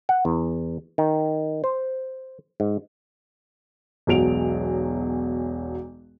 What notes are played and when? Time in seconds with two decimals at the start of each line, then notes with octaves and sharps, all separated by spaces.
0.09 F#5
0.25 E2
0.98 D#3
1.64 C5
2.60 G#2
4.07 E1 B1 F#3 D7 F7